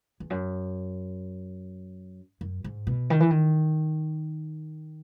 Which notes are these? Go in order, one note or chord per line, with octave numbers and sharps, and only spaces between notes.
E2
F#2
F#2
G#2
B2
D#3
E3
D#3